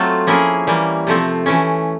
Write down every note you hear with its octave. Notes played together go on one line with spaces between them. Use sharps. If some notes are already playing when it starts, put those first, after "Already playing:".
Already playing: F#3 A3 C4 F4
F3 A#3 C#4 E4 G#4
E3 G3 A#3
C3 F3 A3 C4
E3 A3 C#4